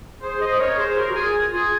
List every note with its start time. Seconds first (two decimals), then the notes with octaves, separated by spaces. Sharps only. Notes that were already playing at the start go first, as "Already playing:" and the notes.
0.21 G#4 C5
0.39 C5 D#5
0.58 A#4 C#5
0.77 G#4 C5
0.96 F#4 A#4
1.09 F#4
1.14 F4 G#4
1.52 F4 G#4